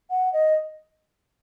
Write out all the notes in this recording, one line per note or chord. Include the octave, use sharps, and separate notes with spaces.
F#5
D#5